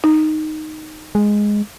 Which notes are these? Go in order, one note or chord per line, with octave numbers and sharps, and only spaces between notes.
D#4
G#3